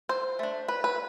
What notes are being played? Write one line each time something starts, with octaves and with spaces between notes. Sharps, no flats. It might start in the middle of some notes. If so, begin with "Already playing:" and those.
C5
A3 D4
B4
B4